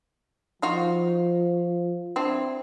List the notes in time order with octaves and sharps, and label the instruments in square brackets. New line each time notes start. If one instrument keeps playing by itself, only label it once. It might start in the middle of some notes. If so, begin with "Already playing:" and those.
[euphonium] F3 [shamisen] D#4 F4 F#4
[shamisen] C4 D4 E4